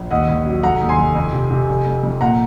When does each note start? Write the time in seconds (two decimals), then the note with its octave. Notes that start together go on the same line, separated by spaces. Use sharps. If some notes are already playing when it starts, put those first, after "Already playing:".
Already playing: A#1
0.11 D#2 D#5 F#5
0.28 D#2
0.45 F#3
0.63 F1 F#5 A#5
0.81 D#2
0.89 G#5 C6
0.98 F1
1.15 F2
1.33 C3
1.51 C3
1.69 F1
1.87 F2
2.03 F2
2.21 A#2 F#5 A#5